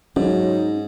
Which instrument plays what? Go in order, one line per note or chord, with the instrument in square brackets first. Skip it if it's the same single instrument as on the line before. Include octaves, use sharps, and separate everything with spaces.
[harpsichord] G#2 [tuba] F#3 [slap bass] C#4 [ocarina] D#4